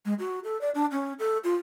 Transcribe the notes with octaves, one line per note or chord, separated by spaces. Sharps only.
G#3
F#4
A4
D5
D4
C#4
A4
F4